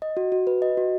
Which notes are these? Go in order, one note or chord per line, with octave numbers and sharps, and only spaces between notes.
D#5
F#4
F#4
B4
D#5
F#4